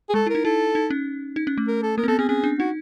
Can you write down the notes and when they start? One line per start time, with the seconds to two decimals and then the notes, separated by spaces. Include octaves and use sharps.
0.10 G#4
0.14 G#3 A4
0.27 E4 A#4
0.35 D#4
0.45 E4 A4
0.75 D#4
0.90 C#4
1.36 D#4
1.47 C#4
1.58 A3
1.68 A#4
1.83 A4
1.98 A#3 A#4
2.04 C4
2.08 B3 A4
2.19 C4 G#4
2.29 C#4 G#4
2.44 D4
2.59 D#4 F#4